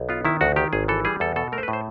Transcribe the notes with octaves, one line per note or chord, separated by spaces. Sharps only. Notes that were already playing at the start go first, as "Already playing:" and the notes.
Already playing: B1
B3 F4
D#3 E4
D2 F#4
D#3 G4
G#1 G#4
E3 A4
G3 G#4
E2 A4
B2 A4
A3 A#4
C5
B4
A2
C5